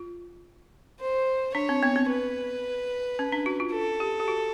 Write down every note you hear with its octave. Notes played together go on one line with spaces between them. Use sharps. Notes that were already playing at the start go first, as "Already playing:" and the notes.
Already playing: F4
C5
D4 C#5
C4
B3
C4
B4
C#4
D4
F#4
F4
A4
G4
G4
F#4